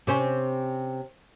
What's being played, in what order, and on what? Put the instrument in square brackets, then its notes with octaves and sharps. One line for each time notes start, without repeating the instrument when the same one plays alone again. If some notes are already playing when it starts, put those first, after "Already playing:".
[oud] C3 C4 C#4